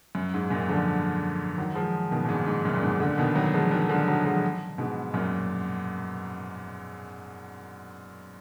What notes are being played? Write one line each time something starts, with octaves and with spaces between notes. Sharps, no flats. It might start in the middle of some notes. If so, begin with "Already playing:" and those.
F#2
G#2
F#2 A#2
D3 F3
D#3 F#3
F3 G#3
B2 D#3
A#2
G#2
G#2
F#2 A#2
A#2
G#2 B2
A#2 D3
B2 D#3
D#3 F#3
F3 G#3
D#3 F#3
D3 F3
D#3 F#3
F3 G#3
G#2 B2
F#2 A#2